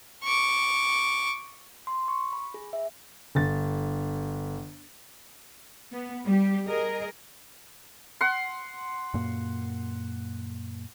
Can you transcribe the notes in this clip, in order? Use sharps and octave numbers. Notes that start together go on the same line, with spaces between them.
C#6 D6
C6
C#6
B5
G#4
E5
G1 A6
B3
G3 G4
G#4 A#4 D#5
F#5 C6
F#2 A#2 A#3